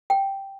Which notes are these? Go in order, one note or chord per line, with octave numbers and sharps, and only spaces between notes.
G5